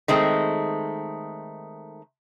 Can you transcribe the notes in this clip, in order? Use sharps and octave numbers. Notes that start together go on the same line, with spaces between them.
D#3 G#3 A3 C4